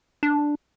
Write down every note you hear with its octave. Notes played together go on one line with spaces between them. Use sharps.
D4